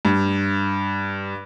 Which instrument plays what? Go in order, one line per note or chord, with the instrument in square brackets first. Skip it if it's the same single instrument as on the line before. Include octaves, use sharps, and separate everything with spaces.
[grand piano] G2